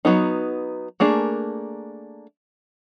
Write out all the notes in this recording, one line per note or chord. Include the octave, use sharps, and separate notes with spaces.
F#3 B3 D#4
A3 A#3 D4 G#4